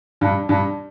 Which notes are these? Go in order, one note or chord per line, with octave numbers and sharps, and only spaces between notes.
G2
G2